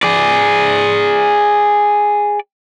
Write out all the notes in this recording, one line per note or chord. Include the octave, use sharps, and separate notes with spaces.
G#4 D5